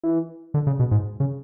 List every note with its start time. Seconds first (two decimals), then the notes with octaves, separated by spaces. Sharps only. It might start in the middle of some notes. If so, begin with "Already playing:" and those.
0.03 E3
0.54 D3
0.67 C#3
0.79 B2
0.91 G#2
1.20 C#3